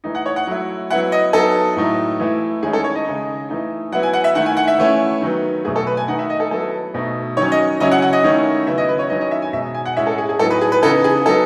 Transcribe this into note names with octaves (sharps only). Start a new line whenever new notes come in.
E3 A3 D#4
F#5
C#5
F#5
F#3 A3 E4
F#3 B3 E4 F#5
D#5
F#3 B3 D#4 A4
A2 F#3 A3 D#4
E3 A3 E4
D#3 G#3 C#4 E4 G#4
A4
C#5
D#5
C#3 G#3 D#4
E3 A3 D#4
F#3 B3 E4 F#5
G#5
F#5
E5
D#3 A3 E4 F#5
G#5
F#5
E5
E3 A3 C#4 E4
D#3 F#3 B3
B2 F#3 A3 G#4
A4
B4
G#5
D#3 A3 D#4 F#5
E5
D#5
A4
F#3 B3 E4 A4
B2 A3 D#4
D#3 F#3 C#4 C#5
D#5
C#3 F#3 C#4 E4 D#5
F#5
F#5
D#5
D#3 A3 C#4 E4
C#3 F#3 B3 E4 E5
D#5
B4
C#5
D#3 F#3 C#4 E4 D#5
D#5
E5
G#5
B2 G#3 D#4 E5
G#5
F#5
A2 G#3 C#4 E4 E5
A4
G#4
G#4
A2 F#3 B3 D#4 A4
B4
G#4
B4
C#3 E3 B3 D#4 A4
G#4
F#3 B3 D#4 A4